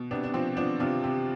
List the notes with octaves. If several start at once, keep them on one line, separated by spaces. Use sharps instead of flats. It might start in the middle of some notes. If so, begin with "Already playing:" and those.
Already playing: B2
C3 B3 D4
D4
F3 C4
F3 B3 D4
C3 D4 F4
C3